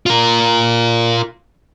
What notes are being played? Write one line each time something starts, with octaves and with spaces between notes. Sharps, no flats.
F4 A#4